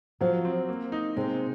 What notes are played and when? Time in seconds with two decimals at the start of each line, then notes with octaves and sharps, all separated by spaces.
0.21 F3 F#3
0.45 C4
0.69 A#3
0.92 D#4
1.16 C3 G#3